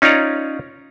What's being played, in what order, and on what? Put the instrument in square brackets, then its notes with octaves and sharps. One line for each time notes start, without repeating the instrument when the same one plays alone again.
[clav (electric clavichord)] C#4 D#4 F4 C#5 D5 A#5